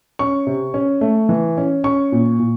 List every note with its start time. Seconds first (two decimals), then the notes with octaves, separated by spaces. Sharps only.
0.19 C#4 C#6
0.47 C3
0.74 C#4
1.01 A3
1.29 E3
1.58 C#4
1.84 C#4 C#6
2.12 A#2
2.39 A#2